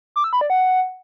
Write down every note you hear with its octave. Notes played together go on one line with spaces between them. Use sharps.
D6
E6
B5
D5
F#5